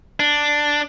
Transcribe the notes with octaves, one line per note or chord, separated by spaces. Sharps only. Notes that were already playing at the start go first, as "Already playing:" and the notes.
D4